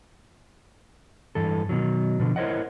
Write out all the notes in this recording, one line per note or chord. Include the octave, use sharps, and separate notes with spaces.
G2 E3 A4
B2 D#3 F#3
B2 D3 F3
E4 A#4 C5 C#5 D#5 F#5